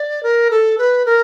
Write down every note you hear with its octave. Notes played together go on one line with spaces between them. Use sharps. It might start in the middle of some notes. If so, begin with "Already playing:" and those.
Already playing: D5
A#4
A4
B4
A#4